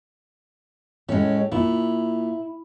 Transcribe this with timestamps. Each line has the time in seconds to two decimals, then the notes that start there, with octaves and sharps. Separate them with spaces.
1.09 A2 G#3 C#4
1.52 A#2 E4